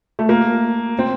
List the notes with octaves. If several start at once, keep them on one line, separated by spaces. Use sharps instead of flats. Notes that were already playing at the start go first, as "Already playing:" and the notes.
A3
A#3
C4